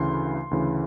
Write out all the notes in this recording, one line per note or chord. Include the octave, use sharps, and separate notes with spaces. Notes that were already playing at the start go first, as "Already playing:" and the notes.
Already playing: D2 C#3 E3 C6
D2 C#3 E3